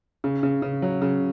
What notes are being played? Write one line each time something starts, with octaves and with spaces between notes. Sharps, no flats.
C#3
C#3
C#3
F#3
C#3